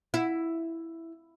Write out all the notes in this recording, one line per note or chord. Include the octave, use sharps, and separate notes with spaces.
E4